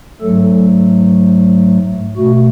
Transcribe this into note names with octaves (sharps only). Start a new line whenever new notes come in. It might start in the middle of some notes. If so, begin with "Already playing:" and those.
G#2 F#3 A3 A4
B2 A3 F#4